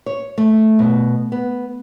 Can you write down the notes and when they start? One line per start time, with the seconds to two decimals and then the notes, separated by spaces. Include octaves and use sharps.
0.06 C#5
0.38 A3
0.79 B2
1.32 B3